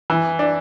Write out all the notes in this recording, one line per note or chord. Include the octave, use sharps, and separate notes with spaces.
E3
D4